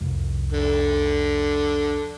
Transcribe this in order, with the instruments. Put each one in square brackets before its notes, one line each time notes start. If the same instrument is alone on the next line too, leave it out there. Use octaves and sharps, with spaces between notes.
[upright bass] C2 F2
[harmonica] D3